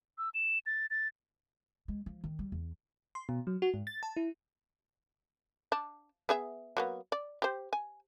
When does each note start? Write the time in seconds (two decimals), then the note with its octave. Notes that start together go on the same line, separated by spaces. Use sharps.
0.18 E6
0.34 E7
0.66 A6
0.90 A6
1.88 G#3
2.06 F3
2.24 D#3
2.39 G3
2.52 E2
3.15 C6
3.29 B2
3.47 F#3
3.62 F#4
3.74 G#2
3.87 A6
4.03 A5
4.17 E4
5.72 D4
6.29 B3 G#4 E5
6.77 F#3 A#3 B3
7.12 D5
7.42 G4 C5
7.73 G#5